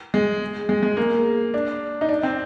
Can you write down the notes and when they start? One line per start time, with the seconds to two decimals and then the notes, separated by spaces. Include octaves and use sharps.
0.14 G#3
0.69 G#3
0.83 G#3
0.97 A#3
1.54 D4
2.01 D#4
2.09 D4
2.23 C4